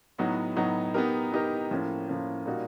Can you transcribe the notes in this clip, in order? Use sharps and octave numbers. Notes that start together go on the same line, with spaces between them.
A2 F#3 B3 D#4 F#4
A2 F#3 B3 D#4 F#4
B3 D#4 G4 A#4
B3 D#4 G4 A#4
A2 F3 A#3 C#4
A2 F3 A#3 C#4
A#2 G3 A#3 D#4 F#4